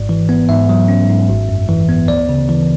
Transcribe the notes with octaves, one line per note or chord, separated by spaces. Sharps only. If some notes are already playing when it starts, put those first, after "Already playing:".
Already playing: G#1 G#2 D5
E3
B3
G#2 E5
F#3
C#4
G#2
G#1
F#2
E3
B3
D2 D5
C#3
E3